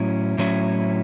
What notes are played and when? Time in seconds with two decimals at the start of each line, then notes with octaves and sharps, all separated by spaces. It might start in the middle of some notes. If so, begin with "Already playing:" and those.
Already playing: A2 F#3 C#4 E4
0.38 A2 F#3 C#4 E4